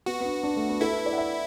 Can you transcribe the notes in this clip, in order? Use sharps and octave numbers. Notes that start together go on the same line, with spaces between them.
B3 F#4
B3
D4
D4
A3
B3
E4 A4
B4
D5
F#5
E5